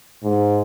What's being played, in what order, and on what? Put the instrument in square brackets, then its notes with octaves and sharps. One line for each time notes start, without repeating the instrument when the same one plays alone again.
[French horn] G#2